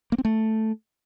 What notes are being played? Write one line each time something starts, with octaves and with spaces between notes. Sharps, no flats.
A#3
C4
A3